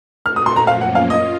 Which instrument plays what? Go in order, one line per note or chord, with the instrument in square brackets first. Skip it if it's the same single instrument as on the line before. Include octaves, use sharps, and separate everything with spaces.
[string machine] A#2 A3 C4 F#4 [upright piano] F6
[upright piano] D#6
C6
A#5
[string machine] F#2 F3 A#3 C#4 F4 [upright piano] F5
[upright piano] F#5
F5
[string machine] F4 [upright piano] D#5